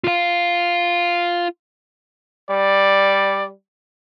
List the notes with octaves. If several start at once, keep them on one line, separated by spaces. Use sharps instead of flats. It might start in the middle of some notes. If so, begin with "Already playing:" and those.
F4 F5
G3 D5